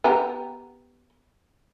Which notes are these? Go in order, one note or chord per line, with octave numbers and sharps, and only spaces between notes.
B3 G4 A#5